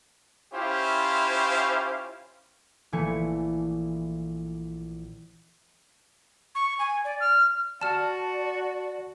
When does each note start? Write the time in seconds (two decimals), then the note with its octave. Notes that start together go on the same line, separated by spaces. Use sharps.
0.54 C#4 E4 F4 G4 C5 F5
2.92 A#1 E3 A3 G#5 C#7
6.55 C#6
6.79 G#5
7.05 D5
7.20 F6
7.81 F#4 D5 A5 F6 E7